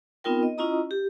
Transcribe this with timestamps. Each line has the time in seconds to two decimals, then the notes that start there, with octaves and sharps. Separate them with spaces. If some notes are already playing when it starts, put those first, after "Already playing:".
0.24 B3 C4 D#4 F4 A#4 G5
0.43 D#5
0.58 C#4 E4 F4 D#5 A#5 D#6
0.91 G4